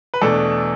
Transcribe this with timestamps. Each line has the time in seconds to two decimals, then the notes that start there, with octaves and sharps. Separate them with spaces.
0.14 B4
0.21 E2 B2 A3 D4 A4